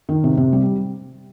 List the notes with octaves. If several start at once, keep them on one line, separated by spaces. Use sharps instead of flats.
D#3
C3
C3
G3